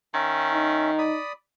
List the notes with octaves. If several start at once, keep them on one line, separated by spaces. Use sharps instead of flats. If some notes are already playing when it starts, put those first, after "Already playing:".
D#3 C#4 E5
D#4
D5 B5 D#6